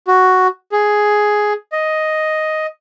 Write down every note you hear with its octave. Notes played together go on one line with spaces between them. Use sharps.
F#4
G#4
D#5